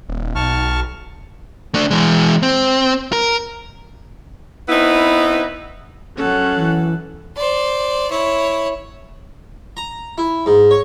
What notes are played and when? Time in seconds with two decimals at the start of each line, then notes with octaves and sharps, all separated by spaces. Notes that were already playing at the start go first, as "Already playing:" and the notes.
0.09 D#1
0.35 B1 A5 C#6 F6
1.74 A3 D4
1.91 E3 G#3
2.43 C4
3.13 A#4
4.69 B3 C4 D#4 E4 B4
6.17 F#2 C#4 A4 F#5
6.56 E3
7.35 C5 D5
8.10 E4 C#5
9.77 A#5
10.18 E4
10.46 G#2
10.71 C#5